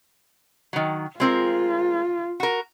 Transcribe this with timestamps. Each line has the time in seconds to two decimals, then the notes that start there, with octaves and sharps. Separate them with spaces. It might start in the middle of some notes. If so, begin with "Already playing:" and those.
0.73 D#3 F#3
1.20 G#3 C4 F4 A#4
2.40 F#4 A#4